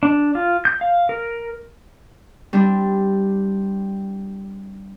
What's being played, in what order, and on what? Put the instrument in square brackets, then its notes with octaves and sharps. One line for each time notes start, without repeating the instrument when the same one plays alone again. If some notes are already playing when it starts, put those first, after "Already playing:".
[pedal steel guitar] D4
F4
G6
F5
A#4
[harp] G3 C4 D4 E4